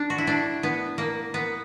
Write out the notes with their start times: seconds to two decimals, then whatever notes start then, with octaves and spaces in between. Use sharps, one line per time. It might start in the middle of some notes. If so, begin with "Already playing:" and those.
Already playing: D4
0.10 F#4
0.18 E4
0.27 D4
0.63 B3
0.98 A#3
1.34 B3